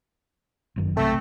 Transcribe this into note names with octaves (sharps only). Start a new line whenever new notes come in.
G1 F#2 D#3
B1 C3 A3 C4